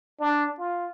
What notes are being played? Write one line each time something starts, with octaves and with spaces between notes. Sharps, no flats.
D4
F4